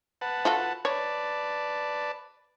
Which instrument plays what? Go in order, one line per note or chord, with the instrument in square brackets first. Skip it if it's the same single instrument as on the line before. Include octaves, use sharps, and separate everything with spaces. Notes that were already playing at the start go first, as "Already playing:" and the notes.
[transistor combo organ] B4 F#5 A5
[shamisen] F4 F#4 A4
[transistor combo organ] B4 D5 A5 [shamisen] C#5